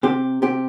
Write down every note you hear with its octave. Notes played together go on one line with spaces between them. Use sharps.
C3 G4
C3 G4